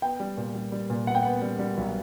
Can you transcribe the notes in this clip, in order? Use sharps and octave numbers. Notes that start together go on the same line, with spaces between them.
B3 G5
G3
A#2
G3
G3
A#2
B3 F#5
G5
B3 F#5
G3
G3
B1